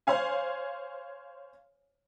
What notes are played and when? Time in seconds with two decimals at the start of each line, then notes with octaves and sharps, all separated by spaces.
0.07 C5 C#5 F5 G#5